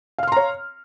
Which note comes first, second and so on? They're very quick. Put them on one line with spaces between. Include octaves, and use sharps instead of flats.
F5 F6 C6 A#5 C#5